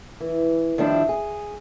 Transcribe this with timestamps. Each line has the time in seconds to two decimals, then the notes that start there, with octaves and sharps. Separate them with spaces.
0.20 E3
0.78 D#3 F3 G3 C4 D4 E4
1.09 G#4